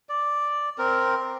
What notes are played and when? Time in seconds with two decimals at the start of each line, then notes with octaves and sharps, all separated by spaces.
0.09 D5
0.78 C4 A#4